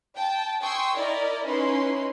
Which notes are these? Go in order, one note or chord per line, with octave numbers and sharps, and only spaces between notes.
G5 A5
G5 G#5 C6 C#6 D#6 E6
E4 A#4 D5 D#5
C#4 D#4 E4 B4 C6